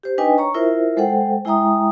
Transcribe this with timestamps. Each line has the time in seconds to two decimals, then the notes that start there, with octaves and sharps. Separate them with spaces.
0.03 G4 C5
0.18 D4 D#4 B4 D#5 G5 G#5
0.38 C#5 A#5 C#6
0.54 E4 F4 A#4 C5 E5
0.97 G#3 A4 C5 F#5 G5
1.45 G#3 E4 E5 G5 A#5 D#6